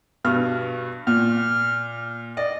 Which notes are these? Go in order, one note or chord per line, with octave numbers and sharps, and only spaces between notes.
G2 B2 F6
A#2 F6
D5 D#5